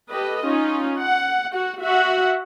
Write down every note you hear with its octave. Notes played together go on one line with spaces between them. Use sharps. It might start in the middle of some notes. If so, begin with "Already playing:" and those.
G4 A4 B4 D#5
C#4 D#4 F4
F#5
F#4 F#5
F#4 E5 F#5